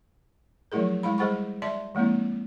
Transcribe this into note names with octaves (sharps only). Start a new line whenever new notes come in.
F3 F#3 A3 E4 G#4 A#4
G#3 E4 F5 B5
G3 G#4 C5 F#5 B5 C#6
D5 E5 A5 C6
F3 G#3 A#3 C4 E4